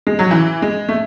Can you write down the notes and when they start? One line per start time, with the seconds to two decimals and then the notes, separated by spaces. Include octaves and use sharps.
0.07 G#3
0.19 F#3
0.31 E3
0.62 G#3
0.89 A3